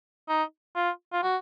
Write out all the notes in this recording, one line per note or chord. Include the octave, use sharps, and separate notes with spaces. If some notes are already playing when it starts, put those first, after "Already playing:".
D#4
F4
F4
F#4